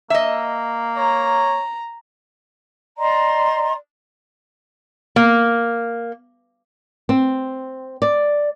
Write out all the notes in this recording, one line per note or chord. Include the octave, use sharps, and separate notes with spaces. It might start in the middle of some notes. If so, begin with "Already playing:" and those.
A#3 D#5 E5
C#5 A#5
D5 D#5 A#5 C6
A#3
C4
D5